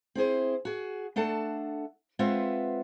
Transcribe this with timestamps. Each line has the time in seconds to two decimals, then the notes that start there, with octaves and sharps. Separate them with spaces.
0.15 C4 E4 G#4 C5
0.65 F#4 G#4
1.16 A3 D4 A4 F#5 A5
2.19 G#3 C4 F4 B4 E5 F#5